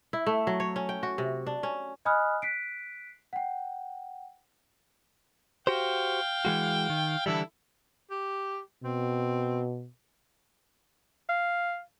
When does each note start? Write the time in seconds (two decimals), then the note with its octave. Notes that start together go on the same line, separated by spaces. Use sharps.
0.13 E4
0.27 A3
0.47 F#3
0.60 C#5
0.76 C#4
0.89 G5
1.03 F#4
1.18 C3
1.47 D4
1.63 C#4
2.05 D#5 G#5 B5 D#6 F6 F#6
2.42 F#6 B6 C7 D7
3.33 F#5 G5
5.67 F#4 G4 C5 F5 G5
6.45 E3 G#3 F#4
6.90 D#3
7.26 D3 E3 G3 E4 A4
8.10 G4
8.84 B2 C4
11.29 F5